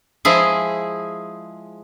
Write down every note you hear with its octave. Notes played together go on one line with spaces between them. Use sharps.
F3 G#3 E4 G#4